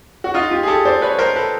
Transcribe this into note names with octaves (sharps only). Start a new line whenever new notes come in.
F#4
D#4 F4
F4 G4
G#4
G4 A4
C5 D5
B4 C#5
A#4 C5
A4 B4